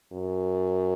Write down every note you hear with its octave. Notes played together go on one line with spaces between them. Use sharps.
F#2